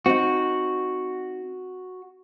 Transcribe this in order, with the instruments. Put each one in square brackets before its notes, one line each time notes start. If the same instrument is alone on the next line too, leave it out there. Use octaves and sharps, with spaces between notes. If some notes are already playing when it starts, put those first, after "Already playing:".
[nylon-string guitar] C4 D#4 [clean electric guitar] F#4